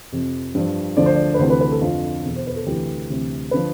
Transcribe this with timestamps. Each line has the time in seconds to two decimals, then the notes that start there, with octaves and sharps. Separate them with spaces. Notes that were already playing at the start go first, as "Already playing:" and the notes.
0.12 F2 C3 F3
0.55 G2 F3
0.97 D2 D3 F3 D5
1.06 C5
1.16 D5
1.34 B4
1.39 D2 C3 E3 C5
1.50 B4
1.61 B4
1.72 A4
1.81 F2 D3 F3 F4
2.24 E2 B2
2.36 C5
2.47 B4
2.56 A4
2.66 D2 C3 E3 G4
3.10 D2 C3 E3
3.51 D3 F3 B4